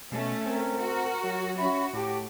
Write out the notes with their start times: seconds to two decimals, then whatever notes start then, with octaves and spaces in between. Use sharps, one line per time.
0.12 B2 A3 C#4
0.46 C4 A#4
0.78 F#4
1.24 F#3
1.57 C#4 F#4 E5 B5
1.93 A2 G4 A5 D6